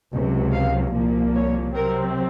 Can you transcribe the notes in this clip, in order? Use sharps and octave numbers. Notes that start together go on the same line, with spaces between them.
C#2 C3 F#3
F5
C2 A#2 F3 A#3
C#5
C3 F#3 C4 A#4